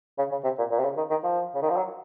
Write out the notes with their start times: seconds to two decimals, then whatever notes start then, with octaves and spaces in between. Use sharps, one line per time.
0.18 C#3
0.31 C#3
0.44 C3
0.58 A#2
0.71 A#2
0.79 C3
0.84 C#3
0.97 D#3
1.10 D#3
1.23 F3
1.55 C#3
1.62 D#3
1.70 F3
1.77 F#3